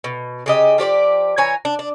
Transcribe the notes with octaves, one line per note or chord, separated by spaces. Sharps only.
B2
C#3 G4 D#5
F3 G4 C#5 D5
E3 C#5 G#5 A#5
D4
D4